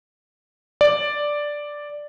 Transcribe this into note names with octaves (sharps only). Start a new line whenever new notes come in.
D5